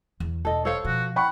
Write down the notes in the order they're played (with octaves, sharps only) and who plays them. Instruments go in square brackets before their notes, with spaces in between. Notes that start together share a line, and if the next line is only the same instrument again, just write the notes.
[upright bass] E2
[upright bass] E1 [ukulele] A4 D#5
[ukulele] A4 C5 F5 [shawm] C#5
[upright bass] B2 F3 [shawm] F#4
[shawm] F#5 [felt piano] G5 B5 C#6